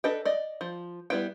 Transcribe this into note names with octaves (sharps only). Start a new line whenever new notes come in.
D4 A4 B4 D#5 G5
D5 D#5
F3
G3 B3 E4 B4 G5